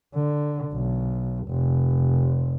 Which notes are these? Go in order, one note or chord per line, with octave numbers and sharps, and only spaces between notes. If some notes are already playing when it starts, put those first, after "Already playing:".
D3
B1
F1